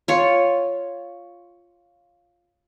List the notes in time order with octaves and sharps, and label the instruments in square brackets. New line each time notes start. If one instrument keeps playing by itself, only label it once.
[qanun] F4 C#5